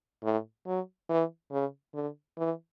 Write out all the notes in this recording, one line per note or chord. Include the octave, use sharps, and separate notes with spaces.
A2
F#3
E3
C#3
D3
E3